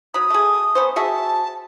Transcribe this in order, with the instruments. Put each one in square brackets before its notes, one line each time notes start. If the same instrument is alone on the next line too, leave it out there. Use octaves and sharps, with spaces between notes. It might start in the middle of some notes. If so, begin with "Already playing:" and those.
[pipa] F#3 B5 [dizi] D#6
[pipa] A3 G#4
B3 C#4 C5
[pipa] F#4 G#4 E5 [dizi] A5